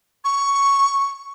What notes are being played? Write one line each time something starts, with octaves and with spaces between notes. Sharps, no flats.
C#6